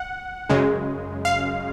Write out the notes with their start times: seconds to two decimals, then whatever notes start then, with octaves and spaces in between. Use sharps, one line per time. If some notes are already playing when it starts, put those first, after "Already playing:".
Already playing: F#5
0.49 F#2 C#3 G#3
1.25 F5